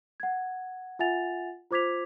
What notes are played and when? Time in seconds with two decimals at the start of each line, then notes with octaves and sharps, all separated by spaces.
0.20 F#5 G#6
0.99 F4 E5 F#5 G#5 A6 F7
1.71 F4 C5 D6 G#6 B6 F7